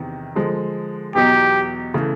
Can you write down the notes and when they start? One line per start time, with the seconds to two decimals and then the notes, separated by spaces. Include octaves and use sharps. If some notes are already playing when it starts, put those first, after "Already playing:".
Already playing: E2 C3 D#3
0.35 D3 F3 G#3
1.15 E2 B2 F#3 B3 D#4 G4
1.94 C#3 E3 A3